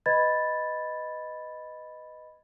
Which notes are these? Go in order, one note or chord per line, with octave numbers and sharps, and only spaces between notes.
B4 D#5 B5 G#6 A6